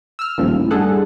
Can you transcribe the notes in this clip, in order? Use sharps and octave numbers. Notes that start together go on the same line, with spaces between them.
E6 F6
D#1 A#2 F3
A2
G2 G#4 A4 F#5